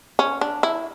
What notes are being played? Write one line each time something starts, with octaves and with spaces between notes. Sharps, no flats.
C#4
D4
E4